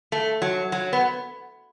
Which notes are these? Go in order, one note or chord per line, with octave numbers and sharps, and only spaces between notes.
A3
F#3
F#3
B3